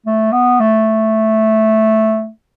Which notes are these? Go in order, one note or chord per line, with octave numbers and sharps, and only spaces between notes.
A3
B3
A3